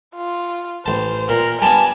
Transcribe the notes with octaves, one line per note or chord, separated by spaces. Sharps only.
F4
A1 C5 A5
A#2 A#4
G3 B3 D4 G#5 A5